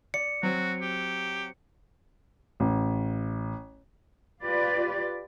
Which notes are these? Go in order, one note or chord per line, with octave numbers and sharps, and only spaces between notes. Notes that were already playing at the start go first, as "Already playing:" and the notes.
D5 C#7
F#3 C4 F#4
G4
A1
F4 G4 B4 D5